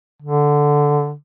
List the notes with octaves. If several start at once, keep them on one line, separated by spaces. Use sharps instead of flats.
D3